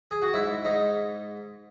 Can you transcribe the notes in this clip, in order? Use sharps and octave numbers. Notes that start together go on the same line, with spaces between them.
G#4
F#4
G#2 E4
G#2 D#4